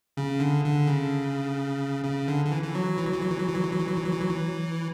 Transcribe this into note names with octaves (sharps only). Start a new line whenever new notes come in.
C#3
D3
D3
C#3
C#3
D3
D3
E3
E3
F#3
E3
F#3
E3
F#3
E3
F#3
E3
F#3
E3
F#3
E3
F#3
E3
F#3
E3
F#3
E3